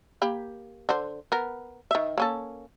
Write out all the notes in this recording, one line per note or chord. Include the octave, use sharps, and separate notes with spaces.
A#3 G4 B5
D3 C5
B3 A#4
D#3 E5
A#3 C#4 A4